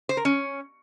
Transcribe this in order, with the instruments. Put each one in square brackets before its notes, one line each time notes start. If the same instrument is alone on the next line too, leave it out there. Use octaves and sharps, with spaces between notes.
[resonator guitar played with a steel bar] C5
A#4
C#4